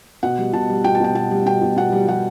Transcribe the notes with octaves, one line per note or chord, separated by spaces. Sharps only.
B2 F#5
G3
B2 A5
G3
B2 G5
A5
B2 G5
B2 A5
G3
B2 G5
B2
B2 F#5
G3
G3 F#5